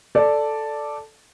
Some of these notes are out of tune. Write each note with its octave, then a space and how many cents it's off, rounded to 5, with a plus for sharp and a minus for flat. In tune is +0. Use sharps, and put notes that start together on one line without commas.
A4 +0 D5 +0